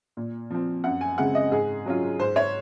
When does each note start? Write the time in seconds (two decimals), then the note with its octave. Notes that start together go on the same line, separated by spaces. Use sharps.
0.17 A#2
0.50 F3 C4
0.84 F#2 F#5
1.01 G#5
1.18 C#3 G#3 C4 F#5
1.35 D#5
1.52 G#2 G#4
1.86 F#3 C#4 F4
2.19 G#2 C5
2.36 C#5